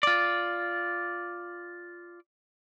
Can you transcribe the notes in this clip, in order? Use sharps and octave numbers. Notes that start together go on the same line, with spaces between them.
F4 D5